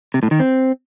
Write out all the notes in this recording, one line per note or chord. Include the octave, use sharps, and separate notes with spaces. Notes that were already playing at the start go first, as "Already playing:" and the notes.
C3
A2
D#3
C4